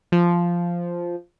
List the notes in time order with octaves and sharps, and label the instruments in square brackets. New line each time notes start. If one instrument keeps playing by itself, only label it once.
[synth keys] F3